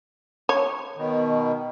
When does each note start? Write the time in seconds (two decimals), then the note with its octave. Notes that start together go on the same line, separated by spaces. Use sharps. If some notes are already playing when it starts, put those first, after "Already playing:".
0.49 C#5
0.97 B2 D#3